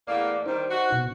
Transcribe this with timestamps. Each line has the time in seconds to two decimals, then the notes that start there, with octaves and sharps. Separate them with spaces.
0.08 E2 A3 A#3 D5
0.46 D#3 G3 D#4 C5
0.69 F#4
0.92 B2